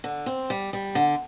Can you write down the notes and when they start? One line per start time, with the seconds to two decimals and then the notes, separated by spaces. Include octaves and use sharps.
0.04 D3
0.26 C4
0.50 G3
0.73 G3
0.95 D3